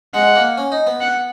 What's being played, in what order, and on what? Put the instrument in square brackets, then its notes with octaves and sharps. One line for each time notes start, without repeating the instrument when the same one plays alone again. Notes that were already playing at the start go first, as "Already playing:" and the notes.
[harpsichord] G#3 [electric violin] F#5
[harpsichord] A#3
C#4
D#4
B3
[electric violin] F#5